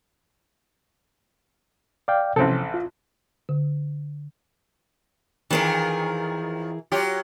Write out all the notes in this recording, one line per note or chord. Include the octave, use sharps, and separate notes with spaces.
D5 F5 G5
A1 C3 F3 C4 C#4 A4
F4
D3
F2 D#3 E3 G#4 A#4
F#3 F4 G4